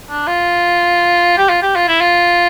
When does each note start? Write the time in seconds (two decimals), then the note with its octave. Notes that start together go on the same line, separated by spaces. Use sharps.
0.10 D4
0.28 F4
1.38 G4
1.49 F4
1.62 G4
1.75 F4
1.88 E4
2.01 F4